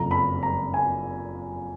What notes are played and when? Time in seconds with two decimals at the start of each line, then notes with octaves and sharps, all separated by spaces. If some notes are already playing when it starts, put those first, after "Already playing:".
Already playing: F#1 F2 F3 A#5
0.11 B5
0.43 A#5
0.74 G#5